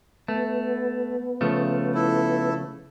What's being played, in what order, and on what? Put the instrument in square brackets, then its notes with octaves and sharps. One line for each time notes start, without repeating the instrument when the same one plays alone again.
[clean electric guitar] A3 [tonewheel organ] B3
[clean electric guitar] C#3 F3 A3
[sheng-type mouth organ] E4 A4